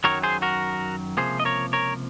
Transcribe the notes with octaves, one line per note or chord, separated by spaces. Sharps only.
F#2 D#3 F#3 A#4 C#5
G#4 C5
F#4 A#4
C#2 C3 F3 A#3 G#4 C5
D#5
A#4 C#5
A#4 C#5